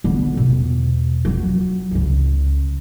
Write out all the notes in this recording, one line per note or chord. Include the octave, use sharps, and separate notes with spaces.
D3 B3
E2 B2
F2 F#3
C#2 C#3